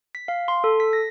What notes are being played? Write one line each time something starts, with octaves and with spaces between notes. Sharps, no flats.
B6
F5
C6
A4
B6
A#6